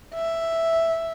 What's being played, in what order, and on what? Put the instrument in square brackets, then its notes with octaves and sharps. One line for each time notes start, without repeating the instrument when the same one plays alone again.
[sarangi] E5